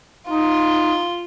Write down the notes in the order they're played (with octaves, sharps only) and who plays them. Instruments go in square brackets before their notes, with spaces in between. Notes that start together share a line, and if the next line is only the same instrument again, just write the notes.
[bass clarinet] D#4 [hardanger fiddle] F4